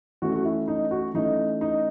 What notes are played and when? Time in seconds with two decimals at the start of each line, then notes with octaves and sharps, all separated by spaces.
0.22 E3 A3 C#4 F#4
0.36 F#4
0.45 E4
0.68 D#4
0.91 F#4
1.14 E3 A3 C#4 D#4
1.61 D#4